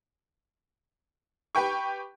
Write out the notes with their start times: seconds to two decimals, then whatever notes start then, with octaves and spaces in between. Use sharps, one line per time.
1.55 G4 B4 G5 C#6